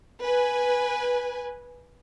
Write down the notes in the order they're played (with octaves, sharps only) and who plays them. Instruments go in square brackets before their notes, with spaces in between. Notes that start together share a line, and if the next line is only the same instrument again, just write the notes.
[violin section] B4 G#5